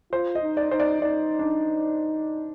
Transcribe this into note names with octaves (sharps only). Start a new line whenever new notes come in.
F4 C5
D#5
D#4
D5
D#4 C5
D5
D#4 D5
D4